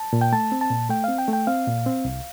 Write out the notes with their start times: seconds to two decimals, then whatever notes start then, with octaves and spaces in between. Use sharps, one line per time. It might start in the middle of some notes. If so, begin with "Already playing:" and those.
Already playing: A5
0.13 A#2
0.21 G5
0.33 A3 A5
0.52 C4
0.61 A5
0.70 A#2
0.89 A3 G5
1.04 C4 F5
1.18 G5
1.28 A3
1.33 G5
1.47 C4 F5
1.67 A#2
1.86 C4
2.05 C2